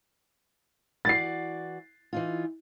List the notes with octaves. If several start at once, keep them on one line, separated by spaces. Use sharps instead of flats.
E3 F#4 D5 A6 C7
E3 D#4 F4